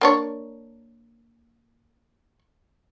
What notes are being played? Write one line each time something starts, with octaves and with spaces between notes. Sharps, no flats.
A#3 D4 C#5